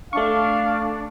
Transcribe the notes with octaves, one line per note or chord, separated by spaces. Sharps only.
A3 D4 F5 C#6